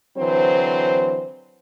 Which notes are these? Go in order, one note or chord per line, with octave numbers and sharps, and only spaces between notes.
D3 E3 F#3 C4 C5